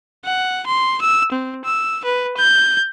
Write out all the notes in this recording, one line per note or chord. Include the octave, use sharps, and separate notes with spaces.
F#5
C6
E6
C4
E6
B4
G6